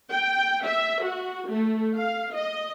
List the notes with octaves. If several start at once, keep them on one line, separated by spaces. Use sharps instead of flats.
G5
E5
F#4
A3
F5
D#5